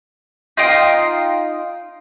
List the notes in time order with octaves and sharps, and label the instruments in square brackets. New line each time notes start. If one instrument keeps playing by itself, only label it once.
[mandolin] D#4 F4 D#5 G5